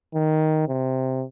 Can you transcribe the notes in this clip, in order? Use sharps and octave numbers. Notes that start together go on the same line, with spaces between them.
D#3
C3